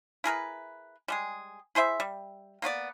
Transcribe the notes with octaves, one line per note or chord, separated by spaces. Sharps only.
E4 G#4 A#4 B4
G3 G#3 G#4
E4 G#4 C5 E5
G3
A#3 B3 C#5 D5